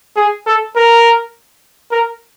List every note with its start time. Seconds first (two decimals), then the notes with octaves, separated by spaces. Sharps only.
0.16 G#4
0.46 A4
0.76 A#4
1.91 A#4